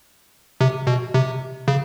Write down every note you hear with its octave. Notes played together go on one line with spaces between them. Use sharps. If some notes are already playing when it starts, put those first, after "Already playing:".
C3
B2
C3
C#3